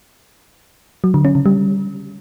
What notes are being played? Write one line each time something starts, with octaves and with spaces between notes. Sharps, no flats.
F#3
D3
C#4
C#3
G3